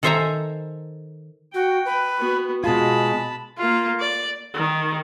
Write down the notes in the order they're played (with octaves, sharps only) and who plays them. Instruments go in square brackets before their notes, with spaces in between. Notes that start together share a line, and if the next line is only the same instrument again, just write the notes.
[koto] D#3 A4 C5 E5 G#5 A#5
[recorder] F#4 [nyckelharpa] G5
[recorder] B4
[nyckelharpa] B3 F#4
[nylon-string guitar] B2 F4 [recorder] G#3 [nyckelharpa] A5 B5
[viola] A#3 F4
D5
D#3